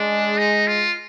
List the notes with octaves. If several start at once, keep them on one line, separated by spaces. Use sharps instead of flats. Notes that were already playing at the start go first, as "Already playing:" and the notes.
Already playing: G#3 D4
D#4
F4